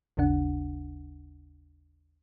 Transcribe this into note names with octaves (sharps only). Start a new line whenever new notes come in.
G#1 D#2 C#3 D4 F#5